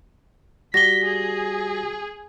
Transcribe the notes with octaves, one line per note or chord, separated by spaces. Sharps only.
G3 F#4 G4 A#6 B6 G7
G#4